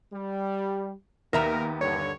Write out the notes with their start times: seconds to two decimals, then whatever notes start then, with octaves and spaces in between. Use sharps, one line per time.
0.12 G3
1.33 D#2 A#3 B3 A#4 E5 A#5
1.81 G2 D3 C#5